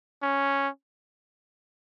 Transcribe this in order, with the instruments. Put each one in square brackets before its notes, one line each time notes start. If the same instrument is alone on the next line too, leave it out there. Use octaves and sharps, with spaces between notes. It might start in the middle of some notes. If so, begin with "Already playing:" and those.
[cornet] C#4